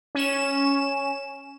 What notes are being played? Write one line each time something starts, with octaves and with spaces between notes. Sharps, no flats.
C#4 E7